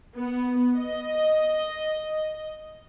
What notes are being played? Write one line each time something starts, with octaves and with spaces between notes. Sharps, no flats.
B3
D#5